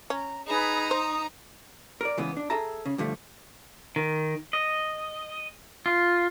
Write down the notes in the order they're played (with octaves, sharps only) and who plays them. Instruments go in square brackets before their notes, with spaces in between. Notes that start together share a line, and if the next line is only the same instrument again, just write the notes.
[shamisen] C#4 [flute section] A#5
[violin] D#4 A#5 [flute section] G#4 B4 B5
[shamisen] C5 [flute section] D#6
[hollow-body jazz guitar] A#4 D5
C#3 E3 G#3 B3
D4
G#4 A4 E5 A5 A#5
C#3
G2 D3 F3 A3
[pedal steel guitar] D#3
D#5
F4